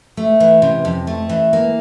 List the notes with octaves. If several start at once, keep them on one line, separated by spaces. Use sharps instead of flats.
A3
E3
C3
F2
A3
E3
A#3